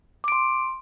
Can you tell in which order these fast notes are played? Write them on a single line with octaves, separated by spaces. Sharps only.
D6 D7 C6